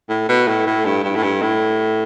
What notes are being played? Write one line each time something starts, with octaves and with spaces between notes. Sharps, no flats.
A2
B2
A2
A2
G2
G2
A2
G2
A2